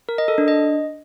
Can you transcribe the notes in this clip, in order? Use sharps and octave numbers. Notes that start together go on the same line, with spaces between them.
A#4
D#5
A4
D4
D#5